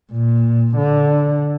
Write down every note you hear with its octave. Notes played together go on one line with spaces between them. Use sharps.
A#2
D3